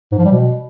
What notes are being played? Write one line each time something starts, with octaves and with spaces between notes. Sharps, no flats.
G#2
F3
G3
B2